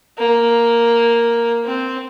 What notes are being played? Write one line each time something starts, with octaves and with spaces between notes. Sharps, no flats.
A#3
C4